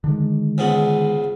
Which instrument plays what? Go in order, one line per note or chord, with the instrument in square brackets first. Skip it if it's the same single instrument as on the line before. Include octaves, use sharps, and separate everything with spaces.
[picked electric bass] D3 D#3 G#3
[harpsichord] C#2 G#2 B3